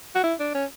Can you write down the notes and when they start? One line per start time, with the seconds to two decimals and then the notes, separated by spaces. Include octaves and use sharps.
0.15 F#4
0.24 E4
0.40 D4
0.54 C#4